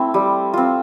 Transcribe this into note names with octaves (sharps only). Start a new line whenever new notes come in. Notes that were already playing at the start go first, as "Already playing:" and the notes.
Already playing: A3 C4 E4
G3
C4 F4